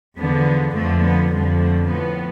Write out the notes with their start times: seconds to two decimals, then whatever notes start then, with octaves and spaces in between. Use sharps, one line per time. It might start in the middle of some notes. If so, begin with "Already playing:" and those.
0.18 E2 D3 F3 B3
0.75 F2 D3 F3 A3
1.03 B3
1.32 F2 D3 F3 G3
1.60 A3
1.88 A2 F3 B3